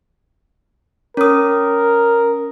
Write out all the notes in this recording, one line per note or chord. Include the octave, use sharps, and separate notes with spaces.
C#4 A#4 D#6